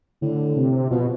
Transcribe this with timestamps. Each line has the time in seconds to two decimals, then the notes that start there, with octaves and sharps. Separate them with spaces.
0.22 A2 D3
0.56 C3
0.91 B2 F3